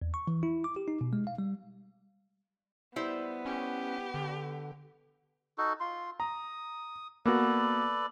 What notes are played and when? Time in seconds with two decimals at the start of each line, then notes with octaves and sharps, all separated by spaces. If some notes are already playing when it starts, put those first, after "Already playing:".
0.02 E2
0.14 C#6
0.27 E3
0.43 E4
0.64 D6
0.76 G4
0.88 D#4
1.01 B2
1.13 G#3
1.27 F5
1.38 G3
2.96 G3 B3 E4 C5
3.45 C#4 G4
4.14 D3
5.58 D#4 F#4 A4
5.80 F4 C6
6.20 A#5 D#6
7.26 A#3 B3 F#4 A4 B4 D5